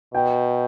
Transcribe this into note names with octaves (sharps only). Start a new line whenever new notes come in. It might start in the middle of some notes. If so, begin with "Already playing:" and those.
B2 G5